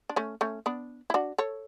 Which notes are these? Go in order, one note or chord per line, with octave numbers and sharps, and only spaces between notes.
D4
A3 C#4
A3 C#4
B3 D4
E4
D4 F#4
A4 C#5